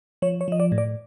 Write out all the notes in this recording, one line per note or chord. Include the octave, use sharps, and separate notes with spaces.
F3 C#5
C#5
F3 D#5
D5
A2
D5